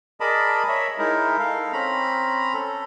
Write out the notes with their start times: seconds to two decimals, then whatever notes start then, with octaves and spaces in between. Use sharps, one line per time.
0.20 G#4 A#4 D5 D#5 A5 B5
0.68 C#5 E5
0.98 G#3 D#4 E4 A#4
1.39 A4 F5
1.73 C4 C#4 A#5 B5
2.54 A4